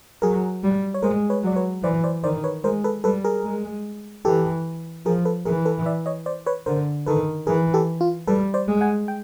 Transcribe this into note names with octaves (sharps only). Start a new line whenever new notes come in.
F#3 G#4 A#4
G3
C#5
G#3 A#4 C5
B4 C#5
F#3 D5
B4 C#5
E3 C5 D5
C5 D5
D#3 C5 D5
B4 C#5
G#3 A#4 C5
A4 B4
G3 A4 B4
G#4 A#4
G#3
E3 G4 A4
F3 G#4 A#4
A4 B4
E3 G#4 A#4
A4 B4
D5 E5
C#5 D#5
C5 D5
B4 C#5
D3 A#4 C5
D#3 A4 B4
E3 G#4 A#4
G4 A4
F4
G3 A4 B4
C5 D5
G#3
F#5 G#5
G5